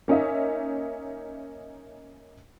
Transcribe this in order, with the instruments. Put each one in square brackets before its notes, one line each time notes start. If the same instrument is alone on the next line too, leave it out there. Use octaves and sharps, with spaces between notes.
[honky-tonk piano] A#3 C#4 D#4 D#5 E5